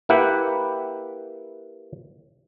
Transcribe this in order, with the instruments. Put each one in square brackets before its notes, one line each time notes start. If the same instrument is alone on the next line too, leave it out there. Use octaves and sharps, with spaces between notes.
[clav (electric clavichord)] A#3 E4 G4 B4 F#5